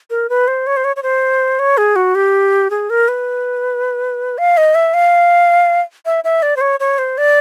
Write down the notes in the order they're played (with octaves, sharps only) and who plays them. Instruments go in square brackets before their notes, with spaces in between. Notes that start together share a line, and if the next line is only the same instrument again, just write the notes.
[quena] A#4
B4
C5
C#5
C5
C#5
C#5
C5
C#5
G#4
F#4
G4
G#4
A#4
B4
F5
D#5
E5
F5
E5
E5
D5
C5
C#5
C#5
C5
D5